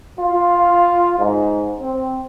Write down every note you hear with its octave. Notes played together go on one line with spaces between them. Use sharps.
F4
G#2
C4